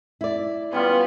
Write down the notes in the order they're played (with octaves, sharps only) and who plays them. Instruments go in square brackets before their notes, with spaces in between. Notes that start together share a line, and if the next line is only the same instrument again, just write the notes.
[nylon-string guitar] E4 D5
[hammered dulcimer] C#3 G3 F4 [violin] B3